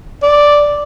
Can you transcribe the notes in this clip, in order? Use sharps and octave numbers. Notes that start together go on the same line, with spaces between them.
D5